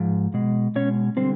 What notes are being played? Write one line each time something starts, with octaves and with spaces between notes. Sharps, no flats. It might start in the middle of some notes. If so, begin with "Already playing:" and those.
Already playing: G#2 F3
B2 G#3
B2 G#3 C#4 C#5
D3 G3 C4 C5